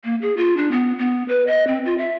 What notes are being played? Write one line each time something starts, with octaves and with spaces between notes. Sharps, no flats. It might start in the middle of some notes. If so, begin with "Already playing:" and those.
A#3
G#4
F4
D4
B3
B3
B4
D#5
C4
F4
E5